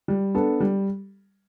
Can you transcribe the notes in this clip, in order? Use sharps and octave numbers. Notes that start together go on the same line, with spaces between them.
G3
B3 D4 A4
G3